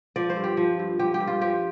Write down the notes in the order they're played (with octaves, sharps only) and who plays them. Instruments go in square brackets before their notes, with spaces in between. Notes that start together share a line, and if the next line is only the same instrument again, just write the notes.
[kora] F3 D5
C5
G2
G4
F3
G2
F3 G4
G4
G2
F4
F3 G4